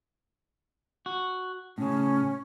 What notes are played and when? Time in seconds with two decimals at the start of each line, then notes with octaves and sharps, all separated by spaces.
1.06 F#4
1.78 A2 C#3 C#4